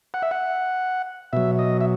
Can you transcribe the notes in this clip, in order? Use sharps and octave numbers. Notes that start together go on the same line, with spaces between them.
F#5
E5
F#5
B2 F#3 E5
D#5
E5